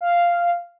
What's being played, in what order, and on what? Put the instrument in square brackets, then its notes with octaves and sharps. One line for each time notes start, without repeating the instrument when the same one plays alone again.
[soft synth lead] F5